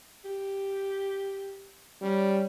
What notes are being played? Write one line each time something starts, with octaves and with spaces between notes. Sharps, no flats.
G4
G3 C#4